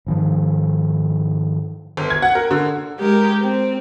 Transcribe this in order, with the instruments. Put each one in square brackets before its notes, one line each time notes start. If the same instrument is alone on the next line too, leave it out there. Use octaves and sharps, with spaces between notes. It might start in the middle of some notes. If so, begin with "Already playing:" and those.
[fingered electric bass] G#2 D#3 F3
[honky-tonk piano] G1
G#6
F#5
A#4
D3
[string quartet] G#3 G4 A#4
C4